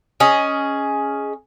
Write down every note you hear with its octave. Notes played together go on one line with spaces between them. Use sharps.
C#4 G#4 D#5